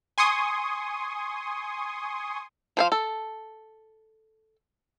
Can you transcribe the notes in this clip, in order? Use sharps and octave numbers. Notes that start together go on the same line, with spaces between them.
G#5 C6 C#6 D#6
F3 C5 F5
A4